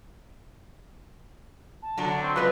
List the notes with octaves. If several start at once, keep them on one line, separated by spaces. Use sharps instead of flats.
A5
D3 F#3 D4
C4 C#6
F3 G#3 F4 B4 F#6